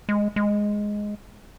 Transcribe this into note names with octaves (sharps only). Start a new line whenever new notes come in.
G#3
G#3